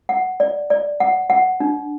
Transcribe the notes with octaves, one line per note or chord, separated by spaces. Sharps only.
F#5
D5
D5
F#5
F#5
D4